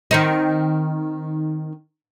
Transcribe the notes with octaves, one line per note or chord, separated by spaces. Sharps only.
D#3 C4 D#4